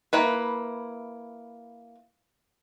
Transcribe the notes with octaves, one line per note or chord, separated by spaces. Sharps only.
A#3 E4 B4